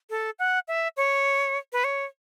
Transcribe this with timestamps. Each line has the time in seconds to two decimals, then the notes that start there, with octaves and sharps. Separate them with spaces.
0.10 A4
0.39 F#5
0.68 E5
0.97 C#5
1.72 B4
1.84 C#5